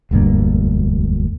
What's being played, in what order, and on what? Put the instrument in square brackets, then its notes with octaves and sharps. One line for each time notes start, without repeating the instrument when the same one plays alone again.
[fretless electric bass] E1 D2 G2 A#3